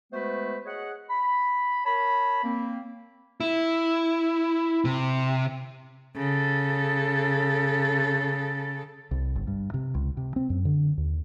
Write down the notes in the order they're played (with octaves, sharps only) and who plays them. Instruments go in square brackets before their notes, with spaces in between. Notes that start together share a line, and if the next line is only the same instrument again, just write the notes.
[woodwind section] G#3 A3 B3 F#4 B4 C5
G#4 C#5 D#5 F#5
B5
A#4 C#5 A5 B5
A#3 C4
[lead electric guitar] E4
C3
[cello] C#3 A4
[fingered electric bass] C2
G1
G2
C3
C#2
C3
C4
F#2
D3
D#2